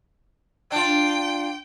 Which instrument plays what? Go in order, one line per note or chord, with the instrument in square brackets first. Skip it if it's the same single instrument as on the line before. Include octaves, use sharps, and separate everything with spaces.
[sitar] D4 F4 [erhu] G5